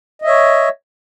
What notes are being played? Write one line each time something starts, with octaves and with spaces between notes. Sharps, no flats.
C#5 D#5 E5